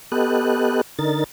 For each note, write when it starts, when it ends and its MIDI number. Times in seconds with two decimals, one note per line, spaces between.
0.12 0.81 59
0.12 0.81 67
0.12 0.81 69
0.12 0.81 75
0.12 0.81 90
0.99 1.24 50
0.99 1.24 63
0.99 1.24 70
0.99 1.24 93